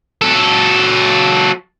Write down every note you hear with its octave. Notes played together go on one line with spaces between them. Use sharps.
F#3 A4